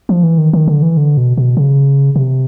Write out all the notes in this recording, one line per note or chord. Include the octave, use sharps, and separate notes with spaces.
F3
E3
D#3
D#3
D3
E3
D3
B2
B2
C#3
C3